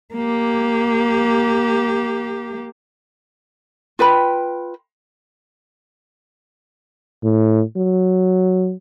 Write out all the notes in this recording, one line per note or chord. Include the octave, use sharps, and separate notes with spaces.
A#3 G4
F4 B4 G5 B5
A2
F#3